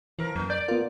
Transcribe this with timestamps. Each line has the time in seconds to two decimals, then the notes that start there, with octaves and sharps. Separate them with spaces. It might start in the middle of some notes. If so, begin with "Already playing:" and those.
0.19 F2 E3 A#4
0.36 F#2 A#3
0.50 D5 G6
0.68 B3 F4 A#4